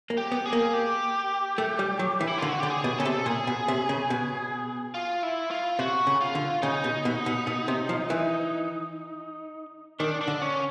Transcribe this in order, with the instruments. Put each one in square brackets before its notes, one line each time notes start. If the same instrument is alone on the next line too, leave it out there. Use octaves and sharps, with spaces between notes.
[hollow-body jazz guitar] A#3
[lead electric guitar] G4
[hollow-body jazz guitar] B3
[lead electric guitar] G#4
[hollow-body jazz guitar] A#3
[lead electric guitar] G4
[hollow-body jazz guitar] A3
G3
F#3
E3
[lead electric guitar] E4
[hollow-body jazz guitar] D3 [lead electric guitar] F4
[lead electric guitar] F#4
[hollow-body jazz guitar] D3 [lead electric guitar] G4
[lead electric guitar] G#4
[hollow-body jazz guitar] B2
[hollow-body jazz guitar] C#3 [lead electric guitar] A4
[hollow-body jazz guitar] C3
[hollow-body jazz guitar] A#2 [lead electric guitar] G#4
[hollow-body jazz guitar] B2
C3
C#3
B2
[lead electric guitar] F4
E4
F4
[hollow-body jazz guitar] C3 [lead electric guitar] F#4
[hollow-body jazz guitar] C#3
[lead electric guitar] F4
[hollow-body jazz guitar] D3
[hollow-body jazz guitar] C#3 [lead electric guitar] D#4
[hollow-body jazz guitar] B2
B2
B2
B2
C3
F3
E3
[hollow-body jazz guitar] D#3 [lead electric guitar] D4
[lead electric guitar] D4
[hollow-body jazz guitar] D3
[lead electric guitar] C#4